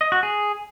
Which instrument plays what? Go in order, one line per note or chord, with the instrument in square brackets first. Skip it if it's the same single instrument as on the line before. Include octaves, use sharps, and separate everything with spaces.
[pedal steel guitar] D#5
F#4
G#4